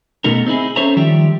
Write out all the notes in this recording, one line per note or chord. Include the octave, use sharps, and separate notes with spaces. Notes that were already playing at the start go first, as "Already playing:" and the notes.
B2 A3 D#4 F#4 A#4
C4 D#4 E4 G#4
C#4 A4 C5 C#5 E5 A#5
D#3 F3 G3 G4 E5